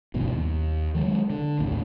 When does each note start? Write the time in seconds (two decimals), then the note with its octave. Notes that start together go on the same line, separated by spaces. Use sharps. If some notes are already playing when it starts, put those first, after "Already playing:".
0.14 A#1 G2 B2 D#3
0.32 D#2
0.95 D#3 F#3 G#3
1.30 D3
1.59 A#1 D#2 A2